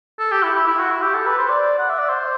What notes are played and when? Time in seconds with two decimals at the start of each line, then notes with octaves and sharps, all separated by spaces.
0.19 A4
0.32 G4
0.43 E4
0.55 E4
0.67 E4
0.79 F#4
0.91 E4
1.02 G4
1.14 A4
1.26 B4
1.38 C5
1.49 D5
1.79 F#5
1.89 E5
1.99 D5
2.09 C5